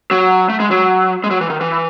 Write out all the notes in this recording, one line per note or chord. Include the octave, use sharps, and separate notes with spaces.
F#3
A3
G#3
F#3
G#3
F#3
E3
D#3
E3